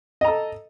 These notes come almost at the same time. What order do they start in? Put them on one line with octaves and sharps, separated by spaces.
D#5 A#5 A4